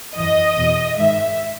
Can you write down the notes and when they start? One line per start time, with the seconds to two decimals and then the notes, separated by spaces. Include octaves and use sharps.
0.16 F#2 E3 D#5
0.56 E2 B2
0.97 G#2 D#3 E5